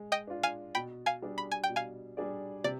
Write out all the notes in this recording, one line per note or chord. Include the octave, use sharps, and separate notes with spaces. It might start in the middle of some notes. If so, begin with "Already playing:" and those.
Already playing: G#3
D#5 G5
D4 F4
F5 G#5
B2 G5 B5
F5 G#5
G3 D4 G#4 D5
B5
G#5
G5
B2
F5 G#5
G3 D4 G#4 D5
C3 D5